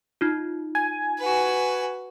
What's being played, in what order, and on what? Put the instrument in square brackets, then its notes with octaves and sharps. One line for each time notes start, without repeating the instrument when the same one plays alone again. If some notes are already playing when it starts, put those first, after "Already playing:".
[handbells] D#4 F4
[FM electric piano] G#5
[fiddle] F#4 B4